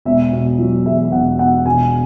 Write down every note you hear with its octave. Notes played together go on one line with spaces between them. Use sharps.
E1 E5
B2
F#3
E2 E5
E1 F#5
B2 F#5
E1 G#5